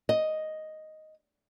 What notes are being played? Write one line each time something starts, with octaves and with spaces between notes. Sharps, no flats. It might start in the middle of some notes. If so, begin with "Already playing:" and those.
D#5